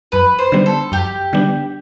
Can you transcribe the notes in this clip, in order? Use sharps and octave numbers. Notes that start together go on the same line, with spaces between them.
F#2 B4
C5
D3 G3 B3 D4
A4
F#2 G4
D3 G3 B3 D4